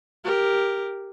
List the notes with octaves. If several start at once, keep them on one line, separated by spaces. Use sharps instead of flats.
G4 A#4